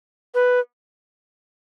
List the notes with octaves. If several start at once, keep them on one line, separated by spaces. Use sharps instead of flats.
B4